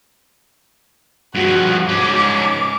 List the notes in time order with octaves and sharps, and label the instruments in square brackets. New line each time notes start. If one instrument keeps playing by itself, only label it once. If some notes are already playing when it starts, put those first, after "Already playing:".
[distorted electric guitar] G2 F3 [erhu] F#4
[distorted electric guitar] G#2 C#4 [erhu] D6